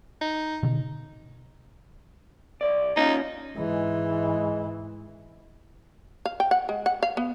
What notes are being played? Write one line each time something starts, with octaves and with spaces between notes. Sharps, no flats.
D#4
B2 D3 D#3
C2 A#2 D5
A#3 C#4 D#4 F4
G#2 E3 G#3
F5
G5
F#5
G#3
F#5
F5
B3